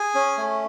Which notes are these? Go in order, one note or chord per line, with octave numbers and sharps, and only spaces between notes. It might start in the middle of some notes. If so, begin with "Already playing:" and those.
Already playing: G#4 G#5
C#4
A3